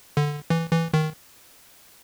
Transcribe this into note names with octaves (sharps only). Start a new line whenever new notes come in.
D3
E3
E3
D#3